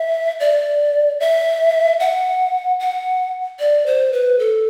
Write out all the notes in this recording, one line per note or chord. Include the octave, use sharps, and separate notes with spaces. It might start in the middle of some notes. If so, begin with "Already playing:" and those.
Already playing: E5
D5
E5
F#5
F#5
D5
C5
B4
A4